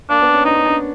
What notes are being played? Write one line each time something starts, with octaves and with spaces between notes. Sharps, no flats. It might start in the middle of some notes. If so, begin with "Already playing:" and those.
A#3 D4
B3
C#4
D4 D#4
C#4
D4